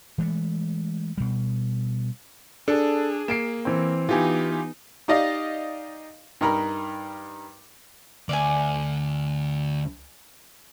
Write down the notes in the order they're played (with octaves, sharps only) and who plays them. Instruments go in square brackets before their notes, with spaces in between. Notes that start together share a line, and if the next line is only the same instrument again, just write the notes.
[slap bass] E3 G#3 A3
B2 G3
[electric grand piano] D4 [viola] G#4 [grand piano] A4
[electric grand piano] A#3 [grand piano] C7 D7 E7
[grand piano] E3 C4
[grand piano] E3 [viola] B3 D#4 [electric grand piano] F4 G4 G#5
[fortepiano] D#4 G4 D5 D#5 F5
G2 D#4 A#4 A#5 B5
[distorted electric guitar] D2 [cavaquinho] D5 G#5